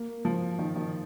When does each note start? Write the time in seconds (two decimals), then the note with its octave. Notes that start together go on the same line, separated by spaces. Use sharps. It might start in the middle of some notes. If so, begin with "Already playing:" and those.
Already playing: A#3
0.25 F3
0.59 D#3
0.76 D#3